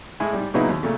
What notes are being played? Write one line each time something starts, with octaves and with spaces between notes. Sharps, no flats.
A2 G#3 E4 G#5
G#2 G3
A#2 C#3 F#3 B3 D#4 E4
D#2
A#2 C#3 A3